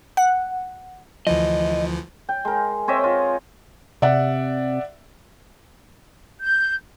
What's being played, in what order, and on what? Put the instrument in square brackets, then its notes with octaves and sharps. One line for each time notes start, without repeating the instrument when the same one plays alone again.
[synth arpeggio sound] F#5
[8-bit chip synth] D2 E3 F3 [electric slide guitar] D#5
[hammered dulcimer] G5
G#3 A#4
C4 C#5 D#5 E5
F4
[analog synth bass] C3 [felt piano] D5 E5 F#5
[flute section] G6